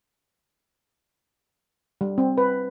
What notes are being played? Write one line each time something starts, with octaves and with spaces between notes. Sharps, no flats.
G3
C4
B4